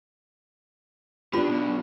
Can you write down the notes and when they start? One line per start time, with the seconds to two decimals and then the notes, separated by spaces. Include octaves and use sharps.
1.33 B3 D4 F4 G4 B4 B5
1.47 B1 B2